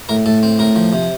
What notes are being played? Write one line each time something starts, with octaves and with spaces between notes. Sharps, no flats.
A2 A#4
A2 A4
C4
A2 A#4
F3
C3